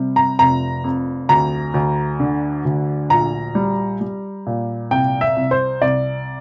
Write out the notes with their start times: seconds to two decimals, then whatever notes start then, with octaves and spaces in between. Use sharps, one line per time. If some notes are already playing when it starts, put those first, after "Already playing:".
Already playing: C3 G3
0.16 A#5
0.39 F1 A#5
0.84 F2
1.29 D2 A#5
1.74 D2
2.20 D3
2.65 D2
3.10 A#1 A#5
3.55 G3
4.01 G3
4.46 A#2
4.91 C2 G5
5.21 E5
5.36 C2
5.51 C5
5.81 C2 D5